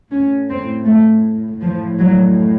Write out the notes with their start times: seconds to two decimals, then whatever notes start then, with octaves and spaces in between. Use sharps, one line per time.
0.11 A2 C#4
0.49 C4
0.86 A3
1.62 A2 F3
1.99 F#3